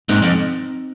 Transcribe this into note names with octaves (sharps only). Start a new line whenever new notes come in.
G#2 C4 D#4
F2